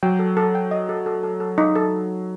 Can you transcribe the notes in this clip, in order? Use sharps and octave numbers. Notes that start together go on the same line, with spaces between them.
F#3 G5
A4
A4
G5
D#5
A4
A4
A4
A4
D#4
A4